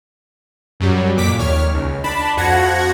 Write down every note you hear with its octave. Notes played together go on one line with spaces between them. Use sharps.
F#2 F#3 G3
F2 A#2 D6 B6
D#2 C#5 F6
C#2
D4 A5 B5
F2 F3 F#4 F#5 G#6 A#6